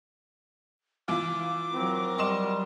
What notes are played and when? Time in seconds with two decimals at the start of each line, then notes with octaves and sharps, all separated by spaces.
1.08 E3 E4 F4 D6
1.74 F#3 C4 A#4
2.18 G3 D#5 C6 E7